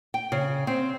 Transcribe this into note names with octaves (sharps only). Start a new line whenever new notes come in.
G5
C#3
C4